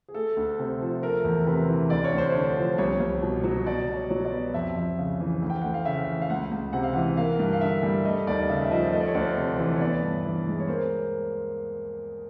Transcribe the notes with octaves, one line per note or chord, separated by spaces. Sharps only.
G#4
A3 A4
D2
C3
F3
A3 A#4
E2
C3 B4
E3
D2 D5
C#5
D2
C5
D3 C#5
F3
C2 C#5
C2
B2
F#3
B2 D5
B2
C#5
F#3
D5
B3
F2 E5
F2
C#3
E3
D2
G5
D2 F#5
F5
C#3 E5
E3
F5
C#2 F#5
C#2
C3 F#5
F5
E3 F#5
A#3 F5
G2
F5
D3 E5
G3
A3 D#5
D#2 D5
D#5
C#3 E5
E5
F3 D#5
A3 D#5
D5
C#5
D2 D5
C3
E3
C#5
B3 D5
G2
E3
G#3
C#5
A#3 C5